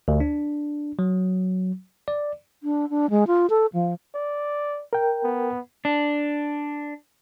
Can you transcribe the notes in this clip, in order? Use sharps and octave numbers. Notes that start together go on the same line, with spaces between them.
D2
D4
F#3
D5
D4
D4
G#3
F4
A4
F3
D5
A#4 G5
B3
D4